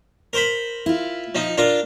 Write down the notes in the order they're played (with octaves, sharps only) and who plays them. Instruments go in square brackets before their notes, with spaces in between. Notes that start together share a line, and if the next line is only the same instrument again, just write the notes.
[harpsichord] A#4 C5 B5
[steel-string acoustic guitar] E4 F4
[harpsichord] F3 D#4
D4 F4 A#4